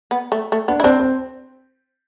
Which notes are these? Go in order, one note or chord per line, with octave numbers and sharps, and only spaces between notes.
B3
A3
A3
B3 D4
E4
C4 D4
C4